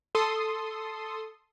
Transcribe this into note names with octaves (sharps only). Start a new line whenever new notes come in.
A4 C6 D#6